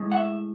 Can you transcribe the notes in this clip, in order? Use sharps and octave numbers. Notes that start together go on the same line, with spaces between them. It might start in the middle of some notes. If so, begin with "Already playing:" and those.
Already playing: A2 G#3
F#5
E5